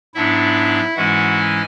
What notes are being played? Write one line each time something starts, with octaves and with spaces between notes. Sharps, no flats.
G#2 F#3 B3 D4 E4 E5
G#2 E3 G#3 C#4 E4 F#4 F#5
G#5